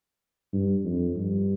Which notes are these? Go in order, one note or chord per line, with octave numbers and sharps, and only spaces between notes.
G2
F2
G2